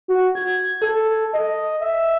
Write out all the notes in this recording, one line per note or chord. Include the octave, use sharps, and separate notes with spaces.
F#4
G#6
A4
D#5
E5